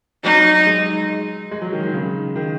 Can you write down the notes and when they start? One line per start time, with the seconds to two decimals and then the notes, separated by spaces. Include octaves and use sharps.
0.24 F#3 D#4
0.66 G#3
1.51 G#3
1.62 F#3
1.73 D#3
1.83 D#3
1.94 C#3
2.36 D#3